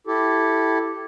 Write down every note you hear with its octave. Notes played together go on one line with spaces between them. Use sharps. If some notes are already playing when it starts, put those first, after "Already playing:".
E4 G4 A4